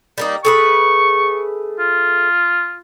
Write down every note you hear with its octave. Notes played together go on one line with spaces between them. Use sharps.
G3 A#3 D#4
A3 G#4 B4 C#6
F4